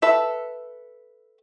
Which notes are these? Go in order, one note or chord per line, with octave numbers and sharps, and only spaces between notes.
A4 B4 E5